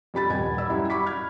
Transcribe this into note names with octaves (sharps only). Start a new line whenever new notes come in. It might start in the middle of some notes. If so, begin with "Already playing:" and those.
F2 G3 B5 A6
D#1 G#5 G#6
D5 B5 E6
F#2 G3 E4
B5 C#6 D6 B6
F6 G#6